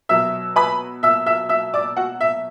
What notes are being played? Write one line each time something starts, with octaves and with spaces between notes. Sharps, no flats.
B2 F#3 E5 E6
B4 B5
E5 E6
E5 E6
E5 E6
D5 D6
F#4 F#5
E5